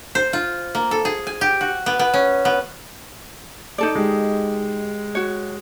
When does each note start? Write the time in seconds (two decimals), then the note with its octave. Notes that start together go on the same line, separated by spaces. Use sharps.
0.15 C5
0.33 F4
0.75 A#3
0.91 A4
1.05 G#4
1.27 G#5
1.41 G4
1.61 F#4
1.86 B3
1.99 B3
2.14 C#4
2.45 B3
3.78 D#4 A4 D5
3.95 G#3 G4
5.15 F#4 C#5